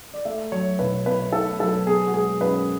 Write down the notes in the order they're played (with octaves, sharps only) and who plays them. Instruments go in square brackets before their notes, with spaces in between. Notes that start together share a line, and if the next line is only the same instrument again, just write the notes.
[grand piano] D5
A3 E5
F#3 C#5
B1 B4
B2 B4
A3 A4
F#3 A4
B3 G#4
F#4
G#3 G#4
F#2 B4